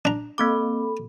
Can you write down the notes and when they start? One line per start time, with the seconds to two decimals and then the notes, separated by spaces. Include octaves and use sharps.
0.05 D4 A#5
0.38 A#3 C4 A4 B5 D6